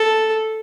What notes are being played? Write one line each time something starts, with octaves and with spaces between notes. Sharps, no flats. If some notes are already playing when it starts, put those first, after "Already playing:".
Already playing: A4